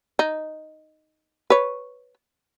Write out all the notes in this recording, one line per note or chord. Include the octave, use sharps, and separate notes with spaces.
D#4
B4 C#5